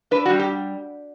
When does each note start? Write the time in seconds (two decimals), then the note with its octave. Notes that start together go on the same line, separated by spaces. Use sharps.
0.11 D4 B4
0.26 F#4
0.30 G3
0.40 G4